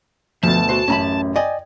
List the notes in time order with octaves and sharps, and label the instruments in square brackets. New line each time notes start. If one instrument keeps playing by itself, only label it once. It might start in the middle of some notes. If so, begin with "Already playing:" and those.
[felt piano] D2 B2 [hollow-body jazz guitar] F3 [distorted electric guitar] A5
[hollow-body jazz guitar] F#4 C5
[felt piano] A1 F#2 [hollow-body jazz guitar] C#4 A#5 B5
[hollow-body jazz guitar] D5 D#5 [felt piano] G5 G#5